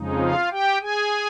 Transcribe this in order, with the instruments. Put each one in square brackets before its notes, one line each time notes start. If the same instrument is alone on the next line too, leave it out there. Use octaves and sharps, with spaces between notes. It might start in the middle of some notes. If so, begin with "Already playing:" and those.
Already playing: [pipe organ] F2 C#3 F3 G#3 D#4
F4 F5
G4 G5
G#4 G#5